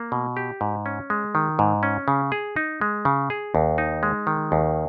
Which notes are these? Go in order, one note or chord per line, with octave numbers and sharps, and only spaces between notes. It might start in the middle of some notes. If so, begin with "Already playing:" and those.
Already playing: A#3
B2
G4
G#2
C#4
G#3
D#3
G#2
C#4
C#3
G#4
D#4
G#3
C#3
G#4
D#2
D#4
G#3
D#3
D#2